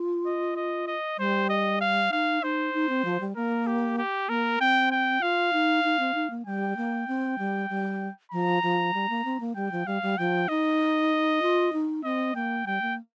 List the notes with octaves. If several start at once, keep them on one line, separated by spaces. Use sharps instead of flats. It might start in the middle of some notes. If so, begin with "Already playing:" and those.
Already playing: F4
D#5
D#5
D#5
G3 C5
D#5
F5
D#4 F5
D#4 C5
D#4
C4
F3
G3
A#3 A#4
G4
G4
A#3 A#4
C4 G5
G5
F4 F5
D#4
D#4
C4
D#4
A#3
G3 G5
A#3
C4
G3
G3
F3 A#5
F3
G3
A#3
C4
A#3
G3 G5
F3
G3 F5
G3
F3 G5
D#4 D#5
F4
D#4
C4 D#5
A#3 G5
G3 G5
A#3